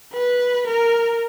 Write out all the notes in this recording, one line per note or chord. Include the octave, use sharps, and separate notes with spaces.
B4
A#4